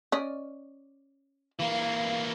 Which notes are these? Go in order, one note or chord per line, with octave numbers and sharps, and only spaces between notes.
C#4 D5 D#5
E3 A#3 F5